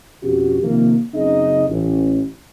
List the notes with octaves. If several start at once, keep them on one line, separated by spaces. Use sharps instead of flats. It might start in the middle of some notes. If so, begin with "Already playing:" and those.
F2 B2 C#4 F#4 G4
C3 D#3 F3 A#3
F#1 C#3 C4 D#4 G#4 D#5
A1